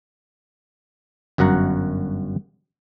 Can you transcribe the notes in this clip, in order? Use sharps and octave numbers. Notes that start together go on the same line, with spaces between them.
G1 F#2 F#4 F#5 A#5